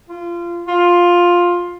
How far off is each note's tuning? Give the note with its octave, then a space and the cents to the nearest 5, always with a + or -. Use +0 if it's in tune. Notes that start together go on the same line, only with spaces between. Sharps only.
F4 -20
F4 +10